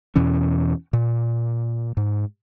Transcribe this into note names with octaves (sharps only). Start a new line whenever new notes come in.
E2 B2 E3 C#4
A#2
G#2